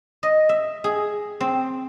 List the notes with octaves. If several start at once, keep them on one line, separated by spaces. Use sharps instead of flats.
D#5
E5
G#4
C4